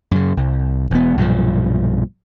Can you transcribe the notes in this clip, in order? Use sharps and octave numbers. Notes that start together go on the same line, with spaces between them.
F#2 C#3
C2
E1 B3
B1 G2 A#2 F3